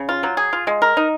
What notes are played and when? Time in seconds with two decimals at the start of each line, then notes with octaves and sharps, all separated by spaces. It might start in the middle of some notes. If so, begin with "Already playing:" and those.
Already playing: C#3
0.09 F4
0.23 F#3
0.37 G#4
0.53 F4
0.67 G#3
0.82 A#4
0.97 D#4